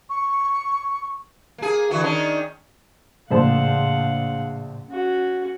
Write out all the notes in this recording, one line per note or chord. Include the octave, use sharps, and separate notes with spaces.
C#6
A#3 G#4
D3 E3 F#4
D#3 C#4 D4
A#1 A2 C#3 A3 C5 F5 F#5 A5
C#4 F#4